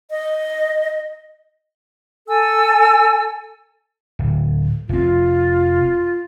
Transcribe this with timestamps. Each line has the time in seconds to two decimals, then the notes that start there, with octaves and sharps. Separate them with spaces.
0.11 D#5
2.28 A4 G#5 E6
4.19 D1
4.89 F1 C4 F4